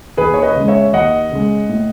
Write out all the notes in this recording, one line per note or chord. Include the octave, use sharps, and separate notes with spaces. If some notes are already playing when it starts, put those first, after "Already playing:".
D#2 G#4 B4
C#5
B4 D#5
C#3 G#3
C#5 E5
D#2 D#5 F#5
C#3 G#3
A2